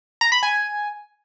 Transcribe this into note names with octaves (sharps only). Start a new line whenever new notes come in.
A#5
B5
G#5